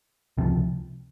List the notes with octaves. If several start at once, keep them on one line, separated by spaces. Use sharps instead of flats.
C#2 C3 F3